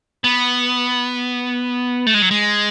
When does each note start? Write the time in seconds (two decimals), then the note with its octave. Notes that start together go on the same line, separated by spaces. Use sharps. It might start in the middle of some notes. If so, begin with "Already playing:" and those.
0.24 B3
2.06 A3
2.14 G#3
2.22 F#3
2.31 G#3